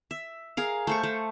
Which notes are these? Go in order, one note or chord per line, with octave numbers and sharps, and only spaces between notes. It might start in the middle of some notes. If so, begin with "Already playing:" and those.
E5
G#4 A#4 F5
A3 C5 C#6
A3